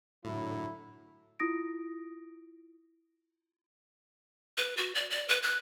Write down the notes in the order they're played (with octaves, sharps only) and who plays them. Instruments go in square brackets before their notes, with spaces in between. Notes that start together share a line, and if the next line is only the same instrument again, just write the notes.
[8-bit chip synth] A2 [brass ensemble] D3 F#3 [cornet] E4
[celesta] E4 F4 D#6 A#6 D7
[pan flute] B4
F#4
D5
D5
B4
F#6